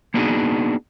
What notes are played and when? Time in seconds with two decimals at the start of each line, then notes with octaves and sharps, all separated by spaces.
0.14 A#3 B3 D4 D#4 F#4 G#4